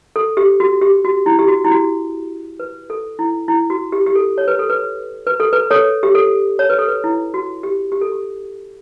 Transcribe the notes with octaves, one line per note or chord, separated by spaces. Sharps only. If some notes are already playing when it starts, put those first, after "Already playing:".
A4
G4
F#4
G4
F#4
E4
G4
F#4
E4
F#4
B4
A4
E4
E4
F#4
G4
G4
A4
C#5
B4
A4
B4
B4
A4
B4
A4 C#5
G4
A4
C#5
B4
A4
B4
E4
F#4
G4
G4
A4
G4